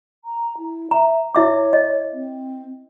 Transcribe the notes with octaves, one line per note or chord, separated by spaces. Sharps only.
A#5
E4
E5 A#5
E4 C#5 E5 D6
D#5
C4